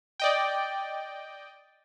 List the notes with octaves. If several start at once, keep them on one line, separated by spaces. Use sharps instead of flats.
D5 D#5 G5